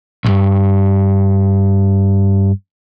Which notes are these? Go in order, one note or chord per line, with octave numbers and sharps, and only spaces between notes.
B1 G2